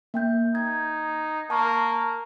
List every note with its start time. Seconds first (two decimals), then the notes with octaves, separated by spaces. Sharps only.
0.14 A#3 G5 G6
0.55 D#4 G#6
1.50 A#3 A5 C#6